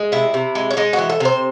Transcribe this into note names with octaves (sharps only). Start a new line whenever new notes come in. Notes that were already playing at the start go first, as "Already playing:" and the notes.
Already playing: G#3
C3 E4
C3
G#3
C#4
G#3 D#4
F#4
E3
A4
C3 C5